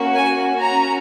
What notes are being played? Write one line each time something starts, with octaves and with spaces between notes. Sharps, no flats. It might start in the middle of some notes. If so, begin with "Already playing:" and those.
Already playing: A#3 C#4 F#4
G#5
C#4 F#4 A#5